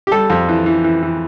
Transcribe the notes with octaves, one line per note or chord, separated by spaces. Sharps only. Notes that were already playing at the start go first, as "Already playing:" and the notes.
G4
G3 A4
F2
E3
E3
E3
E3